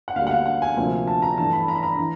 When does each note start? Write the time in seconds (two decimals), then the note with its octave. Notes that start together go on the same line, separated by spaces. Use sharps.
0.08 F#5
0.16 D2 D3 G3 A#3 F5
0.27 F#5
0.31 F5
0.46 F#5
0.62 G#5
0.76 D2 C3 F3 A#3 G#5
1.08 A5
1.22 A#5
1.38 G2 E3 A3 A5
1.53 B5
1.68 A#5
1.75 B5
1.83 A#5
1.98 E3 A#5